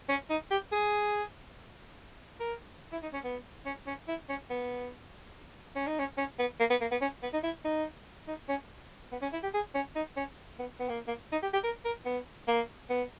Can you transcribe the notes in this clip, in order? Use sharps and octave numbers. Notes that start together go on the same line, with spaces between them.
C#4
D#4
G4
G#4
A#4
E4
D#4
C#4
B3
C#4
C#4
E4
C#4
B3
C#4
D#4
C#4
C#4
B3
A#3
B3
A#3
B3
C#4
B3
D#4
E4
D#4
D#4
C#4
B3
C#4
E4
G4
G#4
C#4
D#4
C#4
B3
B3
A#3
A#3
D#4
G4
G4
A#4
A#4
B3
A#3
B3